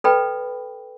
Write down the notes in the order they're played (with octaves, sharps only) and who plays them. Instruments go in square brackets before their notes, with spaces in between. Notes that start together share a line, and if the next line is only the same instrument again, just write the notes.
[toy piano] A4 B4 D5 G5 B5